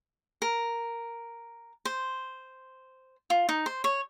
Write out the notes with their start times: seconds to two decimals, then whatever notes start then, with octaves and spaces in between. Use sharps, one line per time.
0.42 A#4
1.85 C5
3.30 F4
3.49 D#4
3.66 C5
3.84 C#5